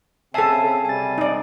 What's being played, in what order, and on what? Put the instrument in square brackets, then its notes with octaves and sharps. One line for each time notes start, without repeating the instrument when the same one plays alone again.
[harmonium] C#3 C4 [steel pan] A4 E5 [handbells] G#5 A5 C7
[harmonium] C3 G3 [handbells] G#5 A6
[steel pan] D#4 D5